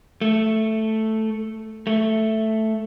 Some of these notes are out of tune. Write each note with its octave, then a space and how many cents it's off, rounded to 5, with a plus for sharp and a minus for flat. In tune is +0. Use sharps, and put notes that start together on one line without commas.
A3 +0
A3 +0